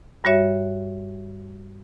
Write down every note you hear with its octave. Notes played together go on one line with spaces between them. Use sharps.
G2 G3 F#4 C#5 E5